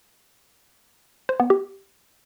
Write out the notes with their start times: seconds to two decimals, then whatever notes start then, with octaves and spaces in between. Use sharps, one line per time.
1.29 C5
1.40 B3
1.50 G4